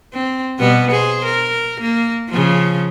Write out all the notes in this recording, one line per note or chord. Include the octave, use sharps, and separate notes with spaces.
C4
B2 G3 B3
G#4 C5
A#4
A#3
C#3 F3